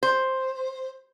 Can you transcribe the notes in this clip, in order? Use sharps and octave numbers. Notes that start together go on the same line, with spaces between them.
C5